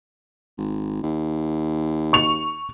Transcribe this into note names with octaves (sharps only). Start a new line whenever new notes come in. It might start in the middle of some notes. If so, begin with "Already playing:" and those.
G#1
D#2
C#6 F7